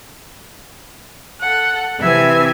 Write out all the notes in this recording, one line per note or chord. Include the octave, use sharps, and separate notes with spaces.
A4 F#5
C3 E3 C4 E5 G#5 G#6